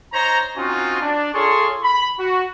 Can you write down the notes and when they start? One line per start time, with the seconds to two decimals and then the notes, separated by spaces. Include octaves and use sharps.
0.13 D#4 C5 C#5 A#5
0.57 C4 C#4 D#4 F4 F#4
1.01 D4
1.35 F4 G#4 A4 C#5 C6 C#6
1.83 B5
2.19 F#4